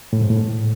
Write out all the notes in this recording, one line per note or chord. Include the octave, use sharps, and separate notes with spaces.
A2
G#2
A2